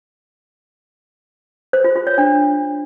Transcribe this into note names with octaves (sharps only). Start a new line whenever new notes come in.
C5
F4
F4
C#5
D4